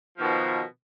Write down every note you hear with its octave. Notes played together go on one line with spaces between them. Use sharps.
B2 D#3 F3